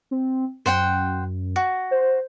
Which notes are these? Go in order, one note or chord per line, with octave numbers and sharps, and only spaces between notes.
C4
F#2 C5 F#5 G5
F#4
C5